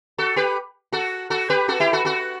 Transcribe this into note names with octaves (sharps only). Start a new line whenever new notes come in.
F#4 A4
G4 B4
F#4 A4
F#4 A4
G4 B4
F#4 A4
E4 G4
F#4 A4
F#4 A4